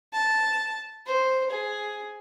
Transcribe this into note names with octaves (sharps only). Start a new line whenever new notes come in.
A5
C5
G#4